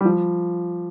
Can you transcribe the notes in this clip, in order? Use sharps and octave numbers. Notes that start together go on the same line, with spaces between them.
G3
F3